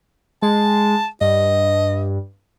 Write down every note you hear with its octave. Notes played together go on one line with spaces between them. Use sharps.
G#3 A5
G2 D#5